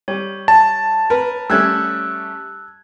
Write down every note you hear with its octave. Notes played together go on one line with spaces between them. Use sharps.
G3 C#5
A5
A#4 B4
G3 A3 C#4 E6 F#6 G#6